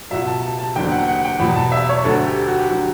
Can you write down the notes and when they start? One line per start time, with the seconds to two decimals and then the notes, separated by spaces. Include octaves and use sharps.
0.10 C#2 B2 F#3 E5
0.27 A5
0.42 A5
0.59 A5
0.75 F#1 E2 D3 F#3 G5
0.92 F#5
1.08 F#5
1.24 G5
1.40 E2 B2 F#3 B5
1.56 A5
1.72 E5
1.89 C#5
2.04 D2 D3 F#3 A4
2.26 G4
2.48 F#4
2.59 G4
2.70 D3 F#3 F#4